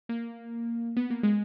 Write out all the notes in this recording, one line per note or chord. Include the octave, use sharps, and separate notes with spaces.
A#3
B3
A#3
G#3